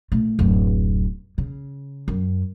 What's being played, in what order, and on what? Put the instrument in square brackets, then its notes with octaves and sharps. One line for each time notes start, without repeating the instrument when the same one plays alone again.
[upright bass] A#2 A3
D1 F#2
C#3
F#2